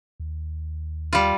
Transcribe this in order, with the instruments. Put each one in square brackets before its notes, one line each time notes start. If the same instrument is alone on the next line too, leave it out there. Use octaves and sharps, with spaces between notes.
[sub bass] D#2
[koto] G3 F4